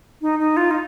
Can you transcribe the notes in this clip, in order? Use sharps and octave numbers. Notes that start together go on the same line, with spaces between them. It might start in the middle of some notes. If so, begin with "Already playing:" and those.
D#4
D#4
F4
D#4